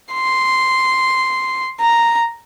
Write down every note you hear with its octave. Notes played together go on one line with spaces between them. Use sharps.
C6
A#5